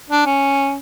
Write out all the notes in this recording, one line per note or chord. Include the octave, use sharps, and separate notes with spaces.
D4
C#4